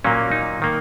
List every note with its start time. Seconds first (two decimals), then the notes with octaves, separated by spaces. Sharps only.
0.04 A#2 F#3 A#3 C#4
0.32 D#4
0.62 D#3 A#3